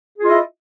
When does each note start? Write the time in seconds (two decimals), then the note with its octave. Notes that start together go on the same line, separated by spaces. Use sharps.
0.18 G#4
0.22 F4
0.26 D#5
0.29 E4